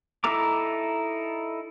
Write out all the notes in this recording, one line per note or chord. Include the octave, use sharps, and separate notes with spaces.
D#4 E4 A4 A#5 D6